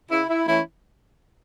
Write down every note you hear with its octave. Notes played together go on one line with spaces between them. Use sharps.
C#3 E4
E4
E3 A3 C#4 E4